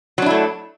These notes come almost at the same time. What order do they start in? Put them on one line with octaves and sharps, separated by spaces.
F#3 D4 E4 A3